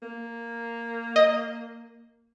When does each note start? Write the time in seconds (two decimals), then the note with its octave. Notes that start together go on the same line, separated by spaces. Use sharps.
0.02 A#3
1.16 D#5